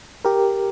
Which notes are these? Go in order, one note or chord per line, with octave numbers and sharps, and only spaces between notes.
G4 A#4